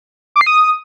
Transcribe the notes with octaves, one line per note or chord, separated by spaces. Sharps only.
D6
C7
D#6